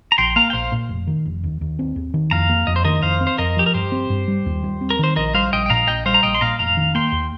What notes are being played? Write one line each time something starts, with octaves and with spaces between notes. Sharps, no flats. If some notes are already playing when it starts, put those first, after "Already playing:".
A#5
A#1 G5 C6
A#3 F5 A#5
G5
A#1 C5 F5
A#2
F1
D#3
F1
D#2
D#2
C4
D#2
D#3
F2 F5 A#5
A#3
F2 D#5
C5
D#3 A#4 D#5
F2 C5 F5
C4
C5
F2 A#4 D#5
F3 G4
A#4
G2 G4 C5
C4
G2
G3
D#2
G3
C4
A#4
D#3 C5
A#1 A#4 D#5
G3 C5 F5
A#1 D#5 G5
G5
A#2 F5 A#5
A#1 D#5 G5
G3 C5 F5
A#5
A#1 D#5 G5
C6
A#2 F5 A#5
F1 F5 A#5
D#3
A#3 G5 C6
D#2